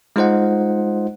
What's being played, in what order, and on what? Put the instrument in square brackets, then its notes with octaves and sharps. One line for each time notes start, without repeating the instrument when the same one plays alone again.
[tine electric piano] G#3 D#4 F4 C5 D#5 F#5